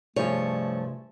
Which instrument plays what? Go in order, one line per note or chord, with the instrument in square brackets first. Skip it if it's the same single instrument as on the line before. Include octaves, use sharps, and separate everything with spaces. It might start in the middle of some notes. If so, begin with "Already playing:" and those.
[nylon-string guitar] G2 F3 G#4 [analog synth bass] C3 [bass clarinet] A3 [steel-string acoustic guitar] C#5